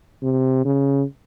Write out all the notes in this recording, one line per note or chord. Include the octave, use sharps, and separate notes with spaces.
C3
C#3